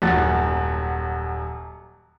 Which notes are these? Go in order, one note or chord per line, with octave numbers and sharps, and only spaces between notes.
D#1 F#2 F#4 A6